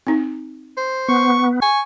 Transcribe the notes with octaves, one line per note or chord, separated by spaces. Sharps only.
C4 D#4
C5
B3 C#6
G#5 C#6